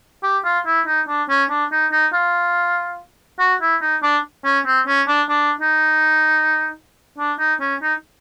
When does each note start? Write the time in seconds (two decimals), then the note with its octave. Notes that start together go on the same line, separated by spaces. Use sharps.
0.23 G4
0.45 F4
0.66 E4
0.86 D#4
1.08 D4
1.29 C#4
1.50 D4
1.72 D#4
1.92 D#4
2.13 F4
3.39 F#4
3.61 E4
3.82 D#4
4.03 D4
4.45 C#4
4.66 C4
4.87 C#4
5.08 D4
5.29 D4
5.61 D#4
7.18 D4
7.39 D#4
7.61 C#4
7.82 D#4